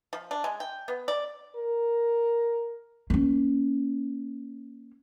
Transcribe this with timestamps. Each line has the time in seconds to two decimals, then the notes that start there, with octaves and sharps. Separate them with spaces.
0.13 F3
0.31 D4
0.44 G#3
0.60 G5
0.88 B3
1.08 D5
1.56 A#4
3.10 A#3 C#4